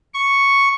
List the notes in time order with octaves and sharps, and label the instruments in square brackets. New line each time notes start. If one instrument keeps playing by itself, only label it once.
[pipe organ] C#6